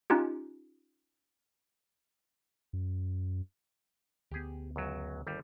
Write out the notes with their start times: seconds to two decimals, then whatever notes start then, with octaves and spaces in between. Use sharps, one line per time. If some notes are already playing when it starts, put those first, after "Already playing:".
0.10 C#4 D#4 F4 G4
2.73 F#2
4.31 D2 B3 G4 G#4
4.76 C#2 F#2 F#3
5.27 G1 D#2 G3